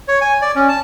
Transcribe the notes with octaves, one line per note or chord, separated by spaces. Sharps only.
C#5
G#5
D5
C#4
A5